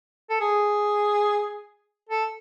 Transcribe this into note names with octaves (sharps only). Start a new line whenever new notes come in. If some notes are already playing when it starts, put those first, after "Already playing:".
A4
G#4
A4